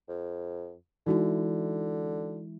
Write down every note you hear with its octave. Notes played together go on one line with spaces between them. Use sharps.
F2
D3 E3 G#3 D#4 E4 F#4